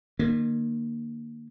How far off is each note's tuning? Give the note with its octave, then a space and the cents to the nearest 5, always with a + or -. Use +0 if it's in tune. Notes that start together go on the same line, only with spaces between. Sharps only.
D#3 -45 A#3 +0